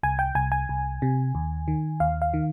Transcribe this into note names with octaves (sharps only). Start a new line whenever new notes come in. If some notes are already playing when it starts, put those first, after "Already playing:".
C2 G#5
G5
C2 G#5
G#5
C2
C3
D#2
D#3
D#2 F5
F5
D#3